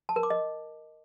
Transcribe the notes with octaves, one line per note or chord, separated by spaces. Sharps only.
A5
A#4
D6
D#5